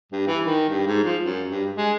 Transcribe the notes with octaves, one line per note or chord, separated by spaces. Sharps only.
G2
E3
D#3
G2
G#2
F3
F#2
G2
G#3